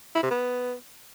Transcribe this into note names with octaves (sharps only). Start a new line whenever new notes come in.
E4
C3
B3